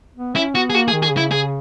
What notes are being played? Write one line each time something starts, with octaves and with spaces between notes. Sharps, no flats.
B3
C#4 E4
B3 F#4
G#4
A#3 F#4
G#4
D#3
G#4
C#3
E4
G#4